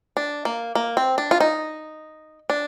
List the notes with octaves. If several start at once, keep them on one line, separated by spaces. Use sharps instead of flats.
D4
A#3
A#3
C4
D4
F4
D#4
D4